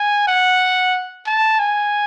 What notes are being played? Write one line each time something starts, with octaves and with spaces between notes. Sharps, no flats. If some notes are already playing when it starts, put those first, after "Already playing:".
Already playing: G#5
F#5
A5
G#5